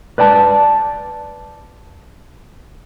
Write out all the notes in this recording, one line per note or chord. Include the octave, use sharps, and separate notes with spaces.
B4 D5 G5 A5